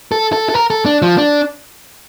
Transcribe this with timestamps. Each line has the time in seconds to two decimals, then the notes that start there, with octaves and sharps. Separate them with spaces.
0.12 A4
0.33 A4
0.49 A4
0.54 A#4
0.70 A4
0.86 D4
1.02 F3
1.18 D4